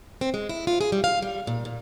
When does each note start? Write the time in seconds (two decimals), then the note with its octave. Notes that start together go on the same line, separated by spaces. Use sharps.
0.21 C4
0.34 G#3
0.49 E4
0.67 F4
0.81 G#4
0.92 G3
1.04 F5
1.22 G3
1.47 A#2
1.65 A#2